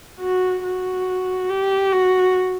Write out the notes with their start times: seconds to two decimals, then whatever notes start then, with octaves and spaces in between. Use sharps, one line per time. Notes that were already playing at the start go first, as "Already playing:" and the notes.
0.20 F#4
0.63 F#4
1.50 G4
1.93 F#4